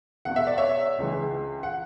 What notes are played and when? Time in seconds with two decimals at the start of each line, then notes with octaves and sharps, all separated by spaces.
0.25 E2 B2 F#5
0.36 E5
0.47 D5
0.58 C#5 E5
0.99 C#2 C#3 E3
1.63 F#5